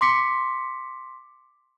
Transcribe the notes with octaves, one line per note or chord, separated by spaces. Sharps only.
C6 D6 B6 C#7